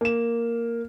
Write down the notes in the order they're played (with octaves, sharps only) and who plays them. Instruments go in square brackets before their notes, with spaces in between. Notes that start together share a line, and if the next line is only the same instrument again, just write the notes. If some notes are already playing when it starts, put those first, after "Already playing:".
[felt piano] A#3 E7